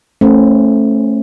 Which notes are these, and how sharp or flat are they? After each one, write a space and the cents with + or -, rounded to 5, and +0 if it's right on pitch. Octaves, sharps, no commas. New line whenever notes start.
A3 +0 C#4 -25 C5 +0